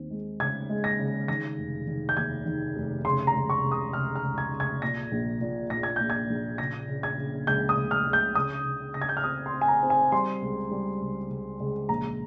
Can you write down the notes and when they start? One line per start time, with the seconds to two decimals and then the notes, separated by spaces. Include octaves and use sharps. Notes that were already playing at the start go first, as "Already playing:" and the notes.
Already playing: D#2 C4
0.11 G#3
0.40 C#3 G#6
0.69 G#3
0.84 A#6
0.99 C#3
1.28 D#3 A#6
1.58 F1
1.87 D#3
2.09 G6
2.17 D#2 G#6
2.46 D#3
2.76 F1
3.05 C#3 C6
3.27 A#5
3.35 C#2
3.50 C#6
3.64 C#3
3.72 D#6
3.93 C#3 F6
4.15 F6
4.23 C#2
4.38 G#6
4.53 C#3
4.60 G#6
4.82 A#2 A#6
5.12 A#1
5.41 A#2
5.70 A#2 A#6
5.83 G#6
5.96 A#2 G6
6.10 G#6
6.30 A#1
6.58 C#3 A#6
6.88 C#3
7.03 G#6
7.18 C#3
7.47 C#2 G6
7.69 D#6
7.77 C#3
7.91 F6
8.06 C#2
8.13 G6
8.35 C#3 D#6
8.65 C#3
8.94 C#3 A#6
9.02 G#6
9.09 G6
9.17 F6
9.24 C4 D#6
9.46 C6
9.53 C4
9.61 G#5
9.68 A#5
9.83 C4
9.90 G#5
10.12 G3 C6
10.42 C#2
10.71 G3
11.01 C#2
11.30 C#2
11.60 C#2
11.89 A#1 A#5